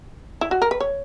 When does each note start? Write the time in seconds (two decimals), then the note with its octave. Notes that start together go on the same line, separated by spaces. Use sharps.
0.41 E4
0.51 F#4
0.62 A#4
0.71 B4
0.80 C#5